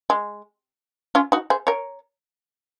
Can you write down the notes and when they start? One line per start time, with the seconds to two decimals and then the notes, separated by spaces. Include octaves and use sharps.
0.10 G#3
1.15 C#4 F4
1.32 D#4 F#4
1.50 G#4 C5
1.67 A#4 C#5